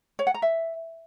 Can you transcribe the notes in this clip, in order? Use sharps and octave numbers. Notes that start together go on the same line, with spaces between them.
C#5
F#5
A#5
E5